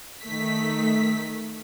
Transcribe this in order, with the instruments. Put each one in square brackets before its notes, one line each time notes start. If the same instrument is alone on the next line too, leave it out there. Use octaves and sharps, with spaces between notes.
[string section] D#3 A3 B6